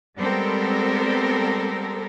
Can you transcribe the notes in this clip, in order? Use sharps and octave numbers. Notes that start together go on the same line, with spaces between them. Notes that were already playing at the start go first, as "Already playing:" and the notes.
G3 G#3 B3 C4 A4 A#4